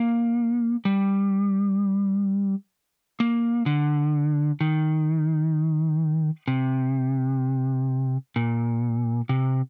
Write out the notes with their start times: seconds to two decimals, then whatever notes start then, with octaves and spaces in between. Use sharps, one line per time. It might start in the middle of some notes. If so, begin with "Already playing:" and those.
Already playing: A#3
0.85 G3
3.20 A#3
3.66 D3
4.61 D#3
6.48 C3
8.36 A#2
9.29 C3